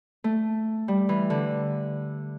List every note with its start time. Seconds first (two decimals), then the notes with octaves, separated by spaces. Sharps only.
0.24 A3
0.88 G3
1.09 E3
1.30 D3